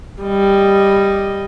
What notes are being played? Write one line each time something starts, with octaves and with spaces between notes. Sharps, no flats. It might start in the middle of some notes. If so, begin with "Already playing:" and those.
G3 D#5